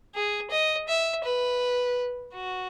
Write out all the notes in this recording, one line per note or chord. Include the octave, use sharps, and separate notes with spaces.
G#4
D#5
E5
B4
F#4